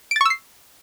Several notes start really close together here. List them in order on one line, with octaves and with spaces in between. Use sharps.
D7 A6 C#6 E6 C7